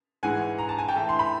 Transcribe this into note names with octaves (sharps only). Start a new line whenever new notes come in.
G#2 E3 G#3 F#5 G#5
A#5
A5
G#5
G5 A5
A2 E3 A3
C6
B5